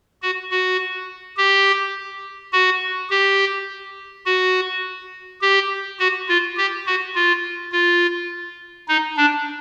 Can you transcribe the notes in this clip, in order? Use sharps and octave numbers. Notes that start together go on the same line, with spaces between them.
F#4
F#4
G4
F#4
G4
F#4
G4
F#4
F4
G4
F#4
F4
F4
D#4
D4